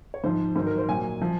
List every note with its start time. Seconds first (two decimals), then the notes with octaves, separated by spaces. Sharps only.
0.14 C#5
0.24 G#2 F3 C5
0.56 G#2 D#3 F#3 C5
0.67 A#4
0.78 C5
0.88 A#2 F#3 G#5
1.22 F3